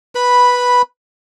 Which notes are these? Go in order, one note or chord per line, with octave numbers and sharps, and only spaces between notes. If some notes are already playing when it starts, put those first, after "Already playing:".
B4 B5